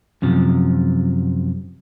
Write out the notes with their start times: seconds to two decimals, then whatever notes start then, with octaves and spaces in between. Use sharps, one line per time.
0.22 F#2 C3 F3